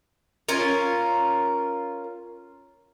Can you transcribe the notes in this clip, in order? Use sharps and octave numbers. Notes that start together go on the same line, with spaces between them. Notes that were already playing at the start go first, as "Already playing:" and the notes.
C#4 F4 A#4